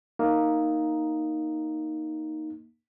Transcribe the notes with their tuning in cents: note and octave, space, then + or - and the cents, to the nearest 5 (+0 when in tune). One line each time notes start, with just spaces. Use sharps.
A#3 +0 D#4 +0